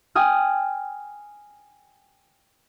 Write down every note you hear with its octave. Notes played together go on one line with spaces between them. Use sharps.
G5 G#5 D#6 F6